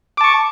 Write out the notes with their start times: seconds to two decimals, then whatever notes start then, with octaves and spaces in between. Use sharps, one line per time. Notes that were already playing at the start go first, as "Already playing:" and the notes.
0.17 D6
0.21 A5
0.24 C#6